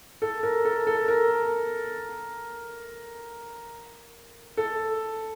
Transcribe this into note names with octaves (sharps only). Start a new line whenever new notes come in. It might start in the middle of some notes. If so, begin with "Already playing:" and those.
A4
A#4
A4
A4
A#4
A4